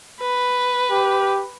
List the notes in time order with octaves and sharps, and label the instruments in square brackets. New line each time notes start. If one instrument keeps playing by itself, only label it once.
[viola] B4
[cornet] G4